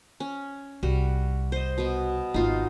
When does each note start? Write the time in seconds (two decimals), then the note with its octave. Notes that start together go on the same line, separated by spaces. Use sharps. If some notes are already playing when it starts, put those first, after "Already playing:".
0.20 C#4
0.83 C2 G3 F#4
1.52 C5 D#5
1.78 B2 B3
2.34 G#1 B3 D#4 F4